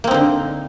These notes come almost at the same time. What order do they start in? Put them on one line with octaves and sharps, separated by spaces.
A#3 C4 D#4 D3